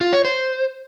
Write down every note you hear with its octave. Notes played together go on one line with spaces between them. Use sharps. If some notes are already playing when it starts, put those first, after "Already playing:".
F4
C#5
C5